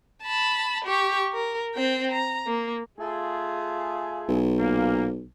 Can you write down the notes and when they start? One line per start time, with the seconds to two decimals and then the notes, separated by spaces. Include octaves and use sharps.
0.23 A5 B5
0.85 G4 C#6
1.33 A#4
1.75 C4 G5
2.11 A#5
2.46 A#3
2.98 A3 F4 G#4
4.28 B1
4.59 A#2 A#3